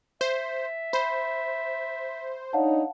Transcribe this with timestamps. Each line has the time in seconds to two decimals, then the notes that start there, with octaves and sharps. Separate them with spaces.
0.21 C5 E5
0.93 C5 B5
2.53 D4 D#4 C#5 F5 F#5 A5